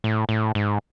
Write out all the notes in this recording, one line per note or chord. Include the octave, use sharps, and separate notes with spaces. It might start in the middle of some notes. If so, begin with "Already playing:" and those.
A2
A2
G#2